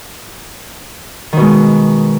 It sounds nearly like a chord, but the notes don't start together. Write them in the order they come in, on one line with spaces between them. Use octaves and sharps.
D#3 B2 G#3